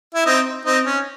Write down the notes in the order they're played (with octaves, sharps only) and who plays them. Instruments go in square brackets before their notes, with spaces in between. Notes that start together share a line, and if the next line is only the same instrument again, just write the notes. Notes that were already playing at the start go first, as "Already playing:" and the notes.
[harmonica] E4
C4 D#4
C4 D#4
C#4